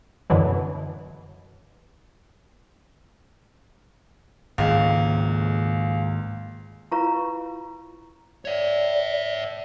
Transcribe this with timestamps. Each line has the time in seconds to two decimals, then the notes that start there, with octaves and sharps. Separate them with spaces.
0.30 F#2 B2 D3 E3 F#3
4.58 C#2 G#2 D#3 A#3
6.92 E4 F4 B4 F5 A#5 C#6
8.45 C#5 D5 E5